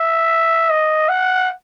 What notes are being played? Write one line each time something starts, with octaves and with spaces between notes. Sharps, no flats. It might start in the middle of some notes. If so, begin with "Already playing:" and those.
Already playing: E5
D#5
F#5